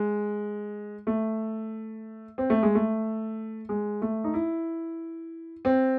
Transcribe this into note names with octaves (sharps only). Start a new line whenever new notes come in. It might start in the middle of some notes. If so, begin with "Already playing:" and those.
Already playing: G#3
A3
C4
A3
G#3
A3
G#3
A3
D#4
E4
C4